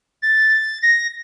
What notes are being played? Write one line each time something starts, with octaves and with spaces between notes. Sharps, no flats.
A6
A#6